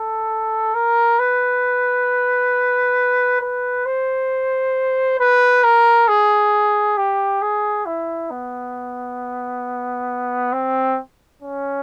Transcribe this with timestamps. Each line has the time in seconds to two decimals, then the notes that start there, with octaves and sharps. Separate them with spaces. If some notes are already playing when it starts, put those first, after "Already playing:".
Already playing: A4
0.74 A#4
1.19 B4
3.41 B4
3.86 C5
5.20 B4
5.64 A#4
6.08 G#4
6.97 G4
7.42 G#4
7.86 E4
8.31 B3
10.53 C4
11.42 C#4